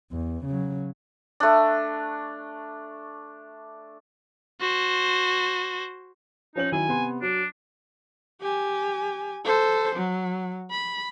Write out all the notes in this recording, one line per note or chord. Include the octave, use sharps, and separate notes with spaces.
E2
C#3 F#3
A3 D4
F#4 C5
F3 C#4 D#4 F#7
D#3 F#3 E4 G#5
C3 B3 C6
F#3 D4
G4 G#5
A4 C5
F#3
B5